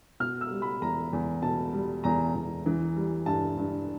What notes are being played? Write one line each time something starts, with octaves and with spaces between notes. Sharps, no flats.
B2 F6
E6
G3
B5
E2 A#5
E2
B2 A5
G3
E2 A#5
E2
E3
G3
G2 A5
G2